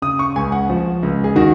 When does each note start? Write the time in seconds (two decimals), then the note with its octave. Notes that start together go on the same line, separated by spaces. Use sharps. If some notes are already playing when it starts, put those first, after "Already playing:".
0.02 C#3 D#6
0.19 C#6
0.36 C#2 G#5
0.52 F#5
0.70 F3
1.03 C#2
1.24 G#4
1.36 D#3 F#4